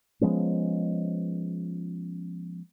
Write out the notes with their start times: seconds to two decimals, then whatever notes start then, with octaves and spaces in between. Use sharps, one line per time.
0.21 F3 G#3 B3 C#4